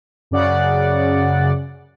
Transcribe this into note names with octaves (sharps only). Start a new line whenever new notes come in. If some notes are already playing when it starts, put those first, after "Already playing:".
F#2 C#3 D5 F#5